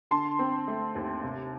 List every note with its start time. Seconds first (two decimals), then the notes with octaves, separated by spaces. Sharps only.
0.11 D3 A5 C6
0.39 C4
0.68 A3
0.95 D#2
1.23 C3